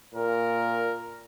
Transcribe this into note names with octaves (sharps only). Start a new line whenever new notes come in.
A#2 A#4